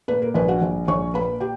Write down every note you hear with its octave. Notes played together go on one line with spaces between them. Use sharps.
A#2 B4
A#4
A#1 B4
F#4 F#5
A#1
A#1 C#5 C#6
A#2 B4 B5
G4 G5